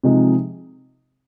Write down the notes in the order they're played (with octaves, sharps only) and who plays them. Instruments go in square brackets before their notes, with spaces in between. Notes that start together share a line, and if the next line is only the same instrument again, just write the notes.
[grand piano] C3 F3 G#3 D#4